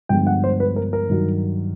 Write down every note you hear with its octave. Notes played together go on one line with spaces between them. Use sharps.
G2 D3 F3 G#3 B3 G5
F#5
C5
B4
A#4
A#4
G2 D#3 F#3